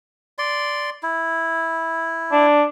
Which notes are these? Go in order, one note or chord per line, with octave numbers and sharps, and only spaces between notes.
D5 C6
E4
D4